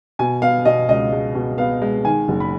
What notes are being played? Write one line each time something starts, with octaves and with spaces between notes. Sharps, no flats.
B2 G#5
B3 F5
B2 D#5
C#2 D#5
G#3
B2
B3 F5
G#3
D#3 G#5
F#1
B5